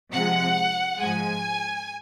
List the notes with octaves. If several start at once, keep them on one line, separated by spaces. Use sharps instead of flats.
C3 F3 G#3 F#5
G#2 F3 G#3 G#5